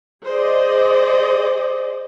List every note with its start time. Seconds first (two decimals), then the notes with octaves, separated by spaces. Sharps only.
0.25 G#4 C5 D5 D#5